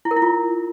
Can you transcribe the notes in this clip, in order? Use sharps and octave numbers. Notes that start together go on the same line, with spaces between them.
E4
A#4
E4
F4